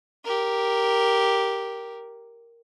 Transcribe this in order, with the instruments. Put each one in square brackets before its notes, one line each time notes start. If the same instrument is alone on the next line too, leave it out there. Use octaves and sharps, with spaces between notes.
[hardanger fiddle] G4 A#4